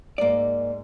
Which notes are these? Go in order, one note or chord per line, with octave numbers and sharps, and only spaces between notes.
G#2 A#3 D5